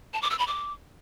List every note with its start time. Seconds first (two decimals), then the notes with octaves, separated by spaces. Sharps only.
0.13 A5
0.22 D6
0.30 E6
0.39 B5
0.47 D6